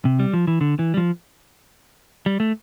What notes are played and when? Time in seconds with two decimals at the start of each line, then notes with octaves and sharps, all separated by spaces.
0.05 C3
0.20 G3
0.33 F3
0.47 E3
0.61 D3
0.79 E3
0.94 G3
0.97 F3
2.26 G3
2.40 A3